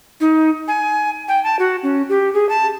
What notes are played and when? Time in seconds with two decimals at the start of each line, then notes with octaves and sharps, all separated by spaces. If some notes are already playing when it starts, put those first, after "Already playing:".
0.20 D#4
0.68 G#5
1.28 G5
1.44 A5
1.59 F#4
1.83 C#4
2.09 G4
2.34 G#4
2.49 A5